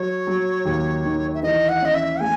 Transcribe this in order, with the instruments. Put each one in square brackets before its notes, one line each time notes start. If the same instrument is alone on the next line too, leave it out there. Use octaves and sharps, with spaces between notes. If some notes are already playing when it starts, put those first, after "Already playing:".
Already playing: [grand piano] F#3 [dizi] C#5
[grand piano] F#3
D#2
D#3
[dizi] E5
[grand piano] E3 [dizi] D#5
[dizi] F#5
[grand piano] C#4 [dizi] D#5
[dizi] E5
[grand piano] A3 [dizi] G#5